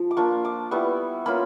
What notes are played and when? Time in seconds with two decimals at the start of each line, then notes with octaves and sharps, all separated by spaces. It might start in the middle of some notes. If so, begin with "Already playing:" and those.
Already playing: F3
0.11 D6
0.17 A#3 D4 F4 C#6
0.45 D6
0.71 G3 B3 E4 C#6
1.26 A#3 C#4 F4 B5